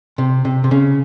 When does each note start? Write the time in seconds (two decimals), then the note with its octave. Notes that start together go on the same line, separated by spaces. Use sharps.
0.18 C3
0.45 C3
0.64 C3
0.71 C#3